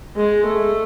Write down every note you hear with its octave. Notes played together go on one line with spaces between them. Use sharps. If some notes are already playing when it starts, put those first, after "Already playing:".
G#3
A3